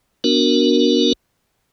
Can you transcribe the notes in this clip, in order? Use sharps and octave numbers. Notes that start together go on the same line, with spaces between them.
B3 D4 F#4 A#4